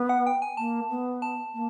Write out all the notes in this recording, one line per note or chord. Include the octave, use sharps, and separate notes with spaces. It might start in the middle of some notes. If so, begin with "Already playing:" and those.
Already playing: B3
F#5
G5
G#5
A#3 A5
B3
A5
A#3